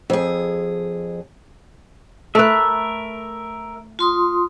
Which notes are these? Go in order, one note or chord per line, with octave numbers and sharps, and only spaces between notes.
F2 G#4
A3 A#4 B4 E5
F4 C6 D#6